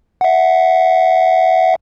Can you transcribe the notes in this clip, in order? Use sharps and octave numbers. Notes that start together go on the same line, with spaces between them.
E5 F#5